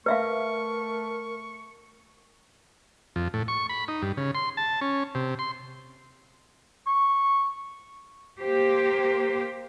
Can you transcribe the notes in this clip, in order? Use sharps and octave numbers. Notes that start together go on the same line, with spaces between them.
A3 A#4 B4 E5 F5 C#6
F2
A2
C#6
B5
D#4
G2
C#3
C6
A5
C#4
C3
C6
C#6
A#3 G4 C5